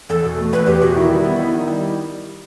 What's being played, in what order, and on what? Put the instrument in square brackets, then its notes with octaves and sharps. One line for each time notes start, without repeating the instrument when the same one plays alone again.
[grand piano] E2 [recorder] A4
[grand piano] B2
A3
[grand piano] E2 [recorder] B4
[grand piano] E2 [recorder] G4
[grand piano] B2 [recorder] F#4
[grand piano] D#3 [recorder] E4
[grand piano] G3
B3
D#4
D#3
G3